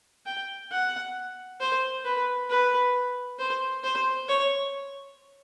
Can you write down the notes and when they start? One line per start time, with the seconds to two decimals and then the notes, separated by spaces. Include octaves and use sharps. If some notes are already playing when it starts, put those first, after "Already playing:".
0.26 G5
0.72 F#5
1.61 C5
2.05 B4
2.50 B4
3.39 C5
3.84 C5
4.28 C#5